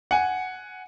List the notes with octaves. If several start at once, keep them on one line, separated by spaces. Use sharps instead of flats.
F#5 G#5